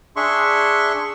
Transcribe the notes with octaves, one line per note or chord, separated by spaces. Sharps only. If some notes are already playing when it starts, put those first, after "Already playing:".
D4 G#4 E5 C6 C#6